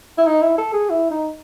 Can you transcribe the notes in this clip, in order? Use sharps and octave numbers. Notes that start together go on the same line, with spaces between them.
E4
D#4
E4
A4
G#4
E4
D#4